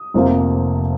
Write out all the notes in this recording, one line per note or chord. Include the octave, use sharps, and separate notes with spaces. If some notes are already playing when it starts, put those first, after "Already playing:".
Already playing: D#6
F1 F2 C3 F3 A#3